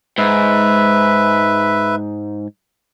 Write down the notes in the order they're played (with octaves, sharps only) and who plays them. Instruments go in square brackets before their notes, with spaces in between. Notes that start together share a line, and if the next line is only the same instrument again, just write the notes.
[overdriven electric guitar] G#2 [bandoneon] B4 E5